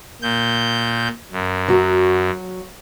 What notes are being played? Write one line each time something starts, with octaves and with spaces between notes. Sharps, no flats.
A#2 G6
F#2
F#3 F#4